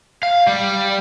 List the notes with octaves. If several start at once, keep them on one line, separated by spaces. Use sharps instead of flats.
F5
G3